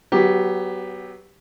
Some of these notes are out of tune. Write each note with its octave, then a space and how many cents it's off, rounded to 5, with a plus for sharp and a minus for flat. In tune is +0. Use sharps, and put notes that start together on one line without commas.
F#3 +25 B3 +0 G4 +10